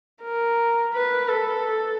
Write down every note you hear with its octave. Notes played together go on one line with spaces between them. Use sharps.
A#4
B4
A4